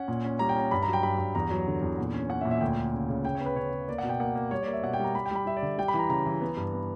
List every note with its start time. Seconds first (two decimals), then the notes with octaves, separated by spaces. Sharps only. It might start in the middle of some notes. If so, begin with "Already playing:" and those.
Already playing: C#4 F#5
0.08 A#2
0.25 C#4
0.39 G3 A#5
0.49 G5
0.56 C#4 A#5
0.71 G2 B5
0.82 A#5
0.87 F#3
0.93 G5
1.03 G2 B5
1.18 G2
1.35 E2 A#5
1.50 F#3
1.67 D3
1.82 E2
1.98 A#2
2.14 C#4
2.30 C#4 F#5
2.41 E5
2.45 A#2
2.51 E5
2.61 D2 G5
2.77 D2
2.94 C#3
3.08 C#3
3.24 C#3 G5
3.35 C#5
3.41 B3
3.46 B4
3.56 C#3 C#5
3.72 C#3
3.88 A#3 D5
3.98 F#5
4.03 B2
4.09 G5
4.20 A#3 F#5
4.35 A#3
4.51 G3 C#5
4.63 A#3 D5
4.73 E5
4.83 B2 F#5
4.94 G5
4.99 G3 A#5
5.15 G3 B5
5.26 G5
5.31 G3 B5
5.46 G3 E5
5.57 D5
5.62 D3
5.78 G3 G5
5.88 B5
5.94 E3 A#5
6.09 C#3 A#5
6.26 E3
6.41 B3
6.57 G2
6.73 B3